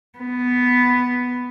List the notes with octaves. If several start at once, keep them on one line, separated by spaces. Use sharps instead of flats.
B3